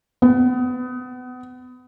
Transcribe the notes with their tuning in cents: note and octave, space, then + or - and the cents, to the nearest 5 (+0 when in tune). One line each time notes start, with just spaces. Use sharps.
B3 +30